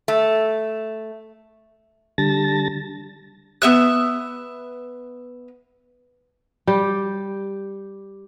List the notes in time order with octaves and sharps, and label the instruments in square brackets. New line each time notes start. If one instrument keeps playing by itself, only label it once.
[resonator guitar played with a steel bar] A3
[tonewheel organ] D3 G3 A5 A6 A#6
[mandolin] B3 E5 F#6
[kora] G3 G4